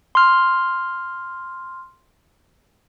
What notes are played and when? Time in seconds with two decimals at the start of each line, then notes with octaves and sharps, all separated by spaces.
0.15 C6 F6